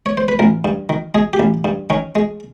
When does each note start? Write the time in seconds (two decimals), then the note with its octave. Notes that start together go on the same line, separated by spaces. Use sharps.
0.06 C#5
0.17 C5
0.28 B4
0.39 A1 A#4
0.65 G2
0.89 D#3
1.15 G#3 G#4
1.33 G4
1.40 A1
1.65 G2
1.90 D#3 C#4
2.15 G#3